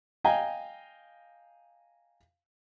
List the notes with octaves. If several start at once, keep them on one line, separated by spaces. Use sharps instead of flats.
D#5 F5 G5 G#5 A#5